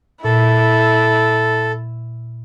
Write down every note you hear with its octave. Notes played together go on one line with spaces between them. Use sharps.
A#2 E4 A4